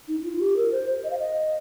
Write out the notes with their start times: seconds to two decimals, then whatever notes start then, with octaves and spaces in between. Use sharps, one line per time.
0.08 D#4
0.20 D#4
0.24 F4
0.40 G4
0.56 A#4
0.72 C5
1.04 D#5
1.11 F5
1.18 D#5